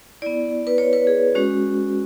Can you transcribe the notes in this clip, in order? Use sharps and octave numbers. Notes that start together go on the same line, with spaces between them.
B3 E4 D5
B4
C#5
B4
G#4
G#3 C#4 F#4